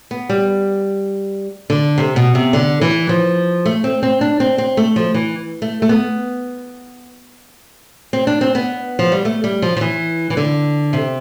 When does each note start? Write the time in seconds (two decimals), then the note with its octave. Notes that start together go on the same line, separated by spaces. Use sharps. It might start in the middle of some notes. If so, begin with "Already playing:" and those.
0.11 B3
0.29 G3
1.70 D3
1.98 C3
2.16 B2
2.35 C3
2.53 D3
2.81 E3
3.09 F3
3.65 A3
3.84 C4
4.03 C4
4.21 D4
4.40 C4
4.58 C4
4.77 A3
4.96 F3
5.14 E3
5.62 A3
5.82 A3
5.89 B3
8.13 C4
8.27 D4
8.41 C4
8.55 B3
8.99 F3
9.12 G3
9.25 A3
9.44 G3
9.62 F3
9.77 F3
9.81 E3
10.30 E3
10.37 D3
10.93 C3